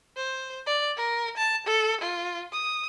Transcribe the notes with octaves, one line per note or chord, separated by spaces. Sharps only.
C5
D5
A#4
A5
A4
F4
D#6